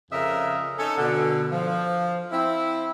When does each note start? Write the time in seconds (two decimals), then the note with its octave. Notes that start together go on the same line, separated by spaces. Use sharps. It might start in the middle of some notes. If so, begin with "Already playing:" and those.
0.12 F2 C#3 A#4 D#5 E5
0.78 C#4 D#4 A4
0.97 B2 D3
1.52 F3
2.32 C4 E4